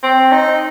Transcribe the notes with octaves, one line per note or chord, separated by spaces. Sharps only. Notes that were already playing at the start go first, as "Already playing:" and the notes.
C4
D#4